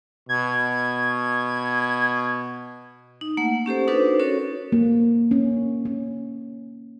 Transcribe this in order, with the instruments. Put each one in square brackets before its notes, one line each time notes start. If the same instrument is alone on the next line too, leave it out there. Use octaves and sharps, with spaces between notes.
[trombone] B2 [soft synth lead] G#6
[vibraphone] D#4
A3 A#3 F#5
C#4 G4 A4 C5
D4 D#4 F#4 A4 B4 C5
C#4 F#4 A4 A#4 C#5
[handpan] A#3
C#4
C#4